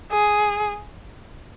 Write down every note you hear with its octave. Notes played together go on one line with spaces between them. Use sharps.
G#4